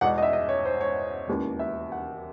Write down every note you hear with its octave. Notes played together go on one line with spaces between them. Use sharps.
E2 B2 G#3 F#5
D#5
E5
D#5
C#5
C5
C#5
E1 D#2 C#3 E3
E5
F#5